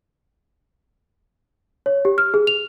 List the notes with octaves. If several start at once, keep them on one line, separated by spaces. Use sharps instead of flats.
C#5
G4
F6
G#4
F7